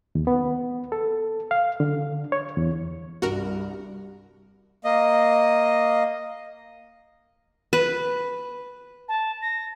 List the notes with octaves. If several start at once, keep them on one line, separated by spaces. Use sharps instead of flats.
D#2
B3
A4
F5
D3
C#5
E2
C2 G2 F#4 A#4
A#3 D#5
B4
A5
A#6